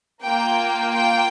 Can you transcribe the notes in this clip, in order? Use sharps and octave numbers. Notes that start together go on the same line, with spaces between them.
A#3 F4 G5
G5